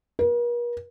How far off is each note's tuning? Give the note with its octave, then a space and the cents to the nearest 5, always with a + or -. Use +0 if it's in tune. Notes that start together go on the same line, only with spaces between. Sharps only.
A#4 +45